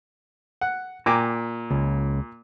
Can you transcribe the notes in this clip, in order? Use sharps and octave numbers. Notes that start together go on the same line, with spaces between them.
F#5
A#2 G5 G#5 A#5 D6
C#2